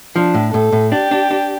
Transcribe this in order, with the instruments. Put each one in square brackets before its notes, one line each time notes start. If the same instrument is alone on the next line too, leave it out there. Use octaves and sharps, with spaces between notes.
[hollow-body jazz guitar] F3 [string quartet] D4
[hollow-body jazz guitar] A2
[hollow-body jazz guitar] A2 [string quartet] A4
[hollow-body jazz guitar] A2
[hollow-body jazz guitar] D4 [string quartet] G4
[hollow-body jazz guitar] D4
D4